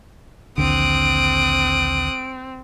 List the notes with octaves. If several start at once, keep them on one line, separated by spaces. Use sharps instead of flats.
A#1 D#2 D3 C4 D#6 F#6 D7